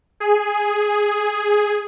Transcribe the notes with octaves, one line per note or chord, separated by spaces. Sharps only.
G#4